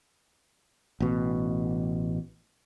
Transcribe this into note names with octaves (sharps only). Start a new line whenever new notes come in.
A1 B2